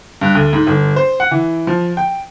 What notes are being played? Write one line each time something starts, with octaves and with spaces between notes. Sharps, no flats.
G2
D2
G#2
G1
C5
F#5
E3
F3
G5